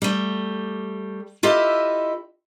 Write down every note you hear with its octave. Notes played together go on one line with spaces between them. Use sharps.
G3 A3
E4 F4 G4 A4 D#5